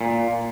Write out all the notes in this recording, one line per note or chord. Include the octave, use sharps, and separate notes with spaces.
A#2